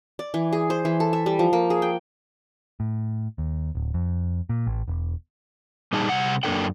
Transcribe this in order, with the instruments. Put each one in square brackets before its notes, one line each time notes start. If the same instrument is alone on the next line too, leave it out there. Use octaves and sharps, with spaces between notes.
[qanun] D5
E3
G#4
C5
E3
A4
E5
G3
F3
A#3
G#4
G5
[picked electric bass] A2
D#2
D1
F2
A#2
A1
E1
[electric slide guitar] A#2 G3 D#4 G#4 A5
C3 G3 F#5
F#2 A#3 D4 A4 G5